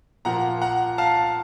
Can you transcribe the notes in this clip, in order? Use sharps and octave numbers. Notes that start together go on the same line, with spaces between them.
A#2 F3 A#3 F#5 A#5
F#5 A#5
F5 A5